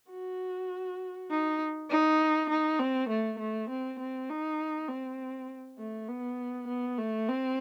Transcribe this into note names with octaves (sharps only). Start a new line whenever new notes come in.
F#4
D#4
D#4
D#4
C4
A3
A3
C4
C4
D#4
C4
A3
B3
B3
A3
C4